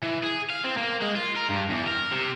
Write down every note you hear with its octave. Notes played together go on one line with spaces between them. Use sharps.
E3
G#4
F5
C4
A#3
G#3
F4
A#4
G2
E2
A#4
C3